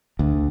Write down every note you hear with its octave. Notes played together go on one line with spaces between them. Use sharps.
D2